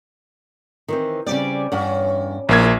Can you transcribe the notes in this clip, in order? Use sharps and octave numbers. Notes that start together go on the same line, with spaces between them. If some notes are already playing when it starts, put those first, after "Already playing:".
D#3 E3 C4
C#3 G3 C4 D5
E2 G2 C#4 F#5
A#1 A3 A#3 E4 G#6